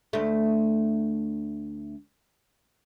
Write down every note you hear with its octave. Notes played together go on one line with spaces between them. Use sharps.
D2 A3